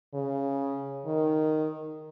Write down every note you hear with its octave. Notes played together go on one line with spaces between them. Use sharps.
C#3
D#3